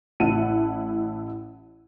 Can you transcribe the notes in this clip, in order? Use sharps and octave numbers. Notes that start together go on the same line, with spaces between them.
A1 E4 F#5 A5 D#7